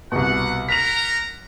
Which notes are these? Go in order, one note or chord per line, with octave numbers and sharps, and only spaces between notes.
C2 B2 F#5
A#4 F#5 A#5 B6 F7